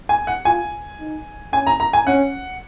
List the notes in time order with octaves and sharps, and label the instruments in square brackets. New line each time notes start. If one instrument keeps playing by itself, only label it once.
[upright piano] G#5
F#5
[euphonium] F4 [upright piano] G#5
[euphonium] D#4
[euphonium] C#4 [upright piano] G#5
[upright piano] A#5
A#5
G#5
[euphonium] C#4 [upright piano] F#5